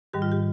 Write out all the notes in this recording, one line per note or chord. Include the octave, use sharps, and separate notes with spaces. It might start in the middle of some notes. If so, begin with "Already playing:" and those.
G#2 D#3 G3 G4
F4
G4